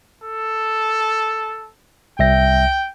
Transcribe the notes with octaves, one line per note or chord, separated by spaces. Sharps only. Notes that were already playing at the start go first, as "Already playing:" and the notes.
A4
C2 E5 G5 A#6